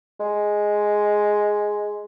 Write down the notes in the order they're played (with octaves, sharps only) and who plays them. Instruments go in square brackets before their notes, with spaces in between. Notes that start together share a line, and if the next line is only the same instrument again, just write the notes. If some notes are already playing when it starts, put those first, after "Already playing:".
[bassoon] G#3